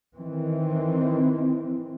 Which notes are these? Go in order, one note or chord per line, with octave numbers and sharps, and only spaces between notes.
D#3 E3 C4